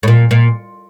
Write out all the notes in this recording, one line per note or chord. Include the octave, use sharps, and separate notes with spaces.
A2
A#2
A#2